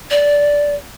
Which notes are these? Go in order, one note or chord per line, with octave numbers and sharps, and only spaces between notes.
D5